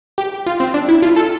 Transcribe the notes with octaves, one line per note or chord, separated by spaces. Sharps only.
G4
F4
C4
D4
E4
F4
A4